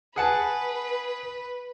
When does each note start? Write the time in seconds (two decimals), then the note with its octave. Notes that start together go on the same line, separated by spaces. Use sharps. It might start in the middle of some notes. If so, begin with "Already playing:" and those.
0.16 G#4 B4 F#5 A5